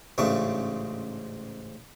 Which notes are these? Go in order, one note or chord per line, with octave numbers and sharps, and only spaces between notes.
A1 G#2 C#3 A3 D4 C#6